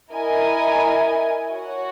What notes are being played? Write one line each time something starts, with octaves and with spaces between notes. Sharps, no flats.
E4 A#4 D#5 G#5
F#4 C#5 F#5